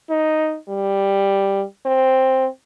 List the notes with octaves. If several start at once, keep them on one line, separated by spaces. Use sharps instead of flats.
D#4
G3
C4